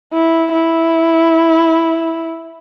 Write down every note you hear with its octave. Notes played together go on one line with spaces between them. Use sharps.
E4
E4